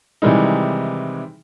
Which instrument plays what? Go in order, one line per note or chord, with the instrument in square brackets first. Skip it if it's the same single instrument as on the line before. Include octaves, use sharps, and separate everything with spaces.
[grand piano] C3 D#3 E3 G3 G#3 D#4